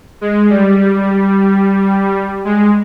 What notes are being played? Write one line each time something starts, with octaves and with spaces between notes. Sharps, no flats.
G#3
G3
G#3